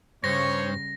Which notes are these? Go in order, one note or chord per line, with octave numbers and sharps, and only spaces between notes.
G2 C#3 G3 C5 C#5 A#6